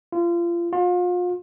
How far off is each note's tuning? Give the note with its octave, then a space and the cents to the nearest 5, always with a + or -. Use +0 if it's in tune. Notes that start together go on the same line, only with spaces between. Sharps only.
F4 -30
F4 +35